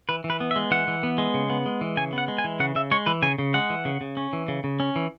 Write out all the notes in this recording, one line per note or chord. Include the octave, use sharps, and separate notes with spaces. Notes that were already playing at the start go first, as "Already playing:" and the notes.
E3 B4
E3
B4
B3
E5
G#3
E3 F#5
E3
B3
G#3
C#3
B3
G#3
E3
C#3 G#5
B3
F#5
G#3
G#5
E3
C#3 F#5
C#3 E5
G#3 C#5
E3 B4
C#3 G#5
C#3
G#3 F#5
E3
C#3
C#3
C#4
E3
C#3
C#3
C#4
E3